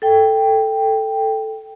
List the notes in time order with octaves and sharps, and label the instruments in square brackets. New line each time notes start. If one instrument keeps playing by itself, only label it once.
[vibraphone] A4 G5